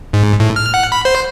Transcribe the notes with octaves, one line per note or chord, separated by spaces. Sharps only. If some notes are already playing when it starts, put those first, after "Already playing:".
G#2
A2
F6
F#5
B5
C5